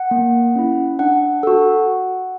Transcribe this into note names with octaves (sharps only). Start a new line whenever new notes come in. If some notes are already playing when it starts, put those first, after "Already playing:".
Already playing: F#5
A#3
C#4 E4
D4 F#5
F#4 A4